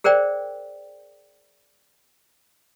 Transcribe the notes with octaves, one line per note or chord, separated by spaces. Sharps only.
G#4 A#4 C5 D5 G5